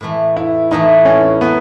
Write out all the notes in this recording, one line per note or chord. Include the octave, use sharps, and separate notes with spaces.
A2 E3 A3
E4
A2 E3 A3 D#4
C#4
B2 F#3 B3